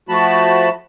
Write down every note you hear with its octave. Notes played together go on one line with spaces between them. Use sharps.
F3 A3 F#4 A5 B5